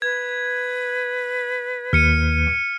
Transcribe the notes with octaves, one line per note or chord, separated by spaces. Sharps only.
B4 G#6
D#2 F6 C#7 D#7